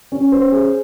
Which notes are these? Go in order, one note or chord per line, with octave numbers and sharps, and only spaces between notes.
C#4
C5
G#4